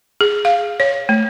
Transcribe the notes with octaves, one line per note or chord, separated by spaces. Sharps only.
G#4
F5
C#5
A3